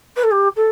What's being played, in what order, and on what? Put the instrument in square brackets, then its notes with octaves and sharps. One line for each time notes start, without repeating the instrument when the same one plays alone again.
[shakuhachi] B4
A4
G4
A4